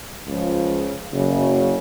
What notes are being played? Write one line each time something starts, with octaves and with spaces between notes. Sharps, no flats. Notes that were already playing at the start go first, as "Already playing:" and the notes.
C#2 C#3 F3
F#1 F#2 C#3 F#3